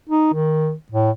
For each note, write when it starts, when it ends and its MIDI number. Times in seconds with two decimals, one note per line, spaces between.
0.09 0.33 63
0.33 0.74 51
0.92 1.11 45